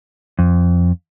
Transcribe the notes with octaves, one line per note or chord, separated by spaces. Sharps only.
F2